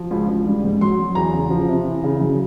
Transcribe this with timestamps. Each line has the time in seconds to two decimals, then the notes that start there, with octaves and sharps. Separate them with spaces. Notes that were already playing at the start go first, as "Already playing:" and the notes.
Already playing: F3
0.11 C#2
0.28 C#2
0.46 G3
0.64 G#2
0.81 F#3 C6
0.99 F#3
1.15 E2 A#5
1.33 C#3
1.50 F3
1.68 C3
1.86 E3
2.04 C#3
2.21 F#2